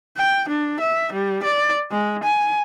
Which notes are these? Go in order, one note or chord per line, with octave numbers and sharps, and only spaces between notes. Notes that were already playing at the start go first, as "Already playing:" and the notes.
G5
D4
E5
G3
D5
G#3
G#5